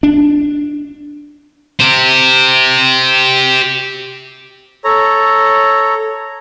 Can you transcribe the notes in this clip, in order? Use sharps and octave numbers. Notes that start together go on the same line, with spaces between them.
D4
G4 C5
A4 C#5 A#5